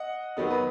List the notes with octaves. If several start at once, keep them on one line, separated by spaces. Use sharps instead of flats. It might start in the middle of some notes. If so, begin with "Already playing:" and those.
Already playing: D#5 F#5
D#3 F#3 B3 D#4
B4 D#5